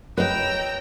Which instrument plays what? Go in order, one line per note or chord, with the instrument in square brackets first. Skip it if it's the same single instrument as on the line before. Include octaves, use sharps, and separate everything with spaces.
[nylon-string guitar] B4 D#5 [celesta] C#5 [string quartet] G5 A#5 E6